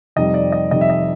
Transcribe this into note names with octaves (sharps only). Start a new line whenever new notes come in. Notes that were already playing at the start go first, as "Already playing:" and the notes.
F2 C3 D#3 G3 D#5
D5
D#5
F2 C3 D#3 G3 D#5
E5
D#5